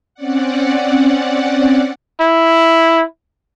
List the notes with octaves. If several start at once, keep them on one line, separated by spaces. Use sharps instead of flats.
C4 C#4 D5 F#5
E4